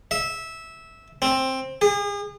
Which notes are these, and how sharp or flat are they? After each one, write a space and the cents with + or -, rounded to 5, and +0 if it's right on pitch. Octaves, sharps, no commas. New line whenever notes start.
E5 -15
C4 +10
G#4 -40